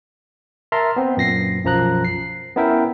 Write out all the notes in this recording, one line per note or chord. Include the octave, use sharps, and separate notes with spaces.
A#4 E5 A5 A#5 C6 F6
B3 C4
F#2 A#2 A#6 C7
B1 F#2 F3 A#5 F#6
C7
B3 C#4 E4 A#4 E5 G5